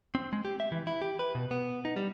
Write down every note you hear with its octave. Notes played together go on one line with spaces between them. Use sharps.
C4
G#3
G4
E5
E3
E4
G4
B4
B2
B3
D#4
G3